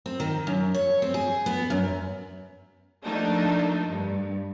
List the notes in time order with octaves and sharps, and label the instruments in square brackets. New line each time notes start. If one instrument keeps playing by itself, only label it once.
[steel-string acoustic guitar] C4
D#3
F#2
C#5
C4
G#4
B3
F#2
[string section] F3 A3 A#3 D4 D#4
G2